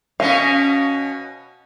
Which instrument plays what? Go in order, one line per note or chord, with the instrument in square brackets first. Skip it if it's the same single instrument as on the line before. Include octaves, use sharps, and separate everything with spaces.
[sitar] B2 C#4 [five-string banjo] F5